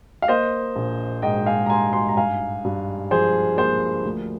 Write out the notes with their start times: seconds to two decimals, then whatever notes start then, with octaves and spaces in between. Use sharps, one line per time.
0.22 F5
0.28 A#3 C5 D#5
0.76 A#1
1.22 G#2 D#5 G5
1.46 F5 G#5
1.66 A#5
1.69 G3 G#5 C6
1.93 G#5 C6
2.09 A#5
2.16 G2 F5 G#5
2.65 G2
3.11 F3 G#4 C5
3.57 A#3 G#4 C5
4.05 D2